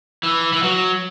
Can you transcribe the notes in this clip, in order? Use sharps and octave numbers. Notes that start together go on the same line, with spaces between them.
E3
E3
F#3